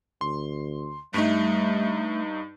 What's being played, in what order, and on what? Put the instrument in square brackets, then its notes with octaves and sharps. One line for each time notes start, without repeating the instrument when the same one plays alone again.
[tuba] D2 [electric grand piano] C6
[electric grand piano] G2 D#4 [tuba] G3 [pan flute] A3